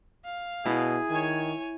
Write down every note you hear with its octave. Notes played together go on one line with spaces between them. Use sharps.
F5
B2 E4 G#4
D#3 C#5 G#5